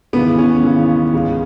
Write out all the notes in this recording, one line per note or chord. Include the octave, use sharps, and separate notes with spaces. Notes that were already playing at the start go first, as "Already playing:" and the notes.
D#2 C#3 E3 G#3 B3
C#4
D#2 C#3 E3 G#3
C#2 C#3 G#3